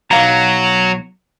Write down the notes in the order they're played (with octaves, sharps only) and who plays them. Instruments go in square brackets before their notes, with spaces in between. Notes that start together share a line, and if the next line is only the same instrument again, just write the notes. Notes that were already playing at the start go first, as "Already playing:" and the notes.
[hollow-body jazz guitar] B1 F5 A#5 [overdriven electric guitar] F#3